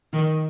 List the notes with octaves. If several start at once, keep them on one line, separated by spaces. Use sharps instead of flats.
D#3